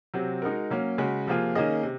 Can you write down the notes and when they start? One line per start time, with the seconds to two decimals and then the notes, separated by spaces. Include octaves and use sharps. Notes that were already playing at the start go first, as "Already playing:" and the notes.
0.14 C3 F#3 C4
0.42 G#3 D#4 F#4 A#4
0.71 F#3 A#3 C#4
0.98 C#3 G#3 C#4 F#4
1.27 C3 F3 A#3 F4 G#4
1.55 D#3 A#3 C#4 G#4 D#5
1.83 C3